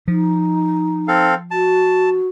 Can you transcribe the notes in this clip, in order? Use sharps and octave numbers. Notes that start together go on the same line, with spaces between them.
F3 D#4
C4 A4 F5
F#4 A5